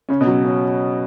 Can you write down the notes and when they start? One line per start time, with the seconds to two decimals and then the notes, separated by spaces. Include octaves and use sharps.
0.09 C#3 C#4
0.20 B2
0.27 F#3
0.44 C#4